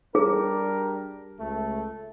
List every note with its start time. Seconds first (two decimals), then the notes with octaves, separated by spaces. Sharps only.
0.15 G3 D4 G#4 A#4
1.40 C#2 A3